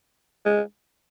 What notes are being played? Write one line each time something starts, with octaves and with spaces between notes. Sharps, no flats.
G#3